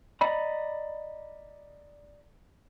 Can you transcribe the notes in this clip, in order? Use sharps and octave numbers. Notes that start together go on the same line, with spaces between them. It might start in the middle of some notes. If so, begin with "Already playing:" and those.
D5 D#5 A#5 B5